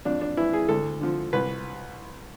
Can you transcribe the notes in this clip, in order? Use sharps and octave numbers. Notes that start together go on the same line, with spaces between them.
F2 D4
D4
E3 E4
G#4
D2 A4
D3 F3
C2 B4